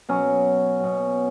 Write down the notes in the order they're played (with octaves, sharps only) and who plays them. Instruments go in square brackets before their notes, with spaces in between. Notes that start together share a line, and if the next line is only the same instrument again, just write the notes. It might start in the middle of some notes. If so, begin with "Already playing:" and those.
[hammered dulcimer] B2 F#3 C#4
B2 F#3